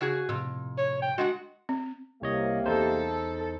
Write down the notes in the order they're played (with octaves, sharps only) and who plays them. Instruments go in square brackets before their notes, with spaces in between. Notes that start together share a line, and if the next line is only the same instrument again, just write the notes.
[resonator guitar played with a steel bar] C#3 F#4 G#4
[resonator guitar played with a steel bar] F2 [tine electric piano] A2 C3
[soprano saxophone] C#5
G5
[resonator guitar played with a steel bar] G#3 D4 F#5 [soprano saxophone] F#4
[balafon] C4
[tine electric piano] C2 C#5 D#5 [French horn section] C3 A#3 G4
[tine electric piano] E2 D#4 C5 [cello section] A4